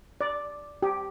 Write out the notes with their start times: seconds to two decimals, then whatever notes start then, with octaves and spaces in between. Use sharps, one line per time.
0.21 D5
0.82 G4